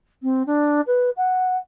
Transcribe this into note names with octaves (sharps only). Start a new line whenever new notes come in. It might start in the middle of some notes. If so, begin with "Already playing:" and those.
C4
D4
B4
F#5